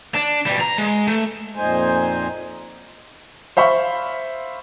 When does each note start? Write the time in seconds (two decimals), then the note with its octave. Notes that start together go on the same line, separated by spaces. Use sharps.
0.15 D4
0.47 B2 G3
0.61 A#5
0.78 G#3
1.08 A3
1.56 F2 A#2 D#4 C5 G#5
3.57 C5 E5 F5 B5 C#6